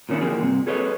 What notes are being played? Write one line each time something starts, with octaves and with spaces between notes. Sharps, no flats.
A#2 D#3 C#4 D4 E4
D3 F3 A#3 E4 G4 G#4
C2 G2 C3
G#4 A4 B4 C#5 D#5